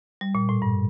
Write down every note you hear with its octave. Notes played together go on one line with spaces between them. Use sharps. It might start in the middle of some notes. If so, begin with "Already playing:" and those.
G3
A#2
A2
G2